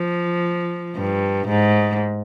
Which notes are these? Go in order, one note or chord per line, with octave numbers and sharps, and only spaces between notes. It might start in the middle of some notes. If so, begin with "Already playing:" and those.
Already playing: F3
G2
G#2